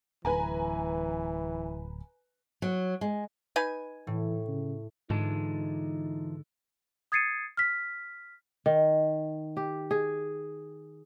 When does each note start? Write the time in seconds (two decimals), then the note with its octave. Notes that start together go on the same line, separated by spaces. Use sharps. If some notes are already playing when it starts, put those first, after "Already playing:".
0.25 D1 E3 B4 G#5 A#5
2.62 F#3
3.01 G#3
3.56 D#4 B4 G#5
4.07 A2 E3
4.48 C#3
5.10 G#2 D3 E3 G#3 D#4 F4 A5
7.12 D#6 G#6 A6 C7 C#7 D#7
7.57 F6 B6
8.66 D#3
9.57 G4
9.91 G#4